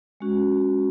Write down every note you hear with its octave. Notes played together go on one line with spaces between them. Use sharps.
G#3 C#4 F#4